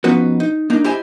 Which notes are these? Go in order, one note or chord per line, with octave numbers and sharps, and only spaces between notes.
F3 B3 C#4 D#4 F#4 B4
D#4
A#3 D4 D#4
E4 G4 C5 D#5 G#5